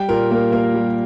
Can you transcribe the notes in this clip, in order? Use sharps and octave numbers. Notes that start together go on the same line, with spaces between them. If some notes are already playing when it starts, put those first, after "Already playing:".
Already playing: G3 G5
A#2 A#4
A#3
A#3 A#4
G3